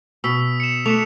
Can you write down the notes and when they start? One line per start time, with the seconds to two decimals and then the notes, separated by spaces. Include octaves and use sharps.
0.24 B2 D#6 E6 B6
0.60 C#7 E7
0.86 A3 D4 C#7 E7 F7